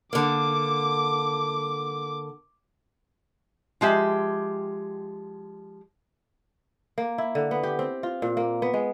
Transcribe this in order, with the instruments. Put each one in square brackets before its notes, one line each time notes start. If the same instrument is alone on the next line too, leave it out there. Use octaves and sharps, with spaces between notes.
[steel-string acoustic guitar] D3 A#3 [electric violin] D6
[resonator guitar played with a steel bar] F3 G#3 G4 E5
[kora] A#3
E4
D3
B3
G4
C4
F4
A#2
A#3
B3
G#3